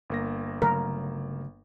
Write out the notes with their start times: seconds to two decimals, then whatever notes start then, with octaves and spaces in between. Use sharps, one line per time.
0.10 G1 A#3 A#6
0.62 C#3 F#3 A3 A#4